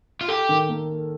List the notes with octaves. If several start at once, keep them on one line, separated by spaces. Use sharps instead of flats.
F4
G4 A4
D#3
A#3